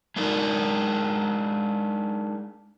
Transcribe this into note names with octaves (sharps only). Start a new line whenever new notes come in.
G#3 D4 D#4 A#4